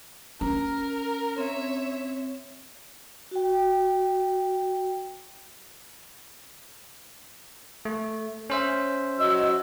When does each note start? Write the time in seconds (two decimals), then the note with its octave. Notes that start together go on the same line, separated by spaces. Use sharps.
0.41 C#4 A#4 A#5
1.38 C4 C#5 E5
3.31 F#4 G5
7.85 A3
8.50 C#4 C5 E5
9.19 F#3 D#5 E6